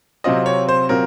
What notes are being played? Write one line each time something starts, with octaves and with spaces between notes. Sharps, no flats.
C3 F#3 C4 F4 D#5
C#5
C5
C3 F#3 C4 F4 A#4